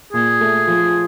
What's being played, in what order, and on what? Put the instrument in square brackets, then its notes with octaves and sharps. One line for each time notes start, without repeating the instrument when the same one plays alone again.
[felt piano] A#2 [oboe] G#4
[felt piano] A3
F3